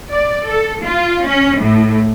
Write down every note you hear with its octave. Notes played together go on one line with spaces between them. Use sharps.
D5
A4
F4
C#4
A2